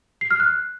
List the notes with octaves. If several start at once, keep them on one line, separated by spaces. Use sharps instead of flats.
C7
F6
F#6